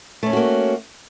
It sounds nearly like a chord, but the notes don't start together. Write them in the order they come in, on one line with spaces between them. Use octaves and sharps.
A3 C#4 A4 F#4 A#3